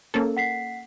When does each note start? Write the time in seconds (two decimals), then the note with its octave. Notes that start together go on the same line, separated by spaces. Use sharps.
0.14 A#3 C#4 A4
0.37 F#5 B6 C7